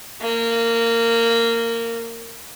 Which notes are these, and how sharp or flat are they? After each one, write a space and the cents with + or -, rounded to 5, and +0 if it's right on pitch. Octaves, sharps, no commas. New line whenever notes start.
A#3 -15